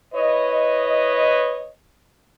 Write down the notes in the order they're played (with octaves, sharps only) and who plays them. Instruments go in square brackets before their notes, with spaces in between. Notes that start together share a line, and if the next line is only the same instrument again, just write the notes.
[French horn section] E4 B4 C#5 D#5